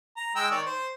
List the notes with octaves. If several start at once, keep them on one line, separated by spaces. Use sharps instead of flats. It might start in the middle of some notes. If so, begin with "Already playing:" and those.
A#5
G#3 G5 E6
D#3 C#5 D5
C5